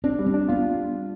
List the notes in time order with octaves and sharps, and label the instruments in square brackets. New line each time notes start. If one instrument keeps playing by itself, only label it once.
[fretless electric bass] C4 [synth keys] D4
[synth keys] G3
[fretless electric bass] C4
[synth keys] D4
[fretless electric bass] B3 [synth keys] F4